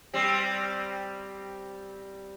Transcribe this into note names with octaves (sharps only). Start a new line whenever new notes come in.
G3 C4